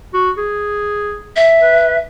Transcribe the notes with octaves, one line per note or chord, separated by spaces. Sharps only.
F#4
G#4
E5
B4